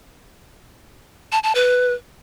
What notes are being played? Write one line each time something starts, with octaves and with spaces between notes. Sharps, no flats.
A5
A5
B4